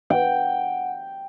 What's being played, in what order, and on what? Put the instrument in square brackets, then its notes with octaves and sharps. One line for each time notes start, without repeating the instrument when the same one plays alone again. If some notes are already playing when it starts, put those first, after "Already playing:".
[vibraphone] F#5 [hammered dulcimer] G5